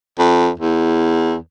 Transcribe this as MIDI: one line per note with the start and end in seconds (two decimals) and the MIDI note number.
0.18 0.49 41
0.60 1.35 40